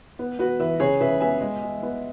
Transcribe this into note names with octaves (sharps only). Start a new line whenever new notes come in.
B3
B3 F#4 B4
E3 B4 E5
C#3 G#4 C#5
C#3 B4 E5
B3 E5 G#5
G#3
G#3
B3